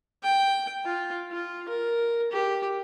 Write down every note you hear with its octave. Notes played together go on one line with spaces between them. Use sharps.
G5
F4
F4
A#4
G4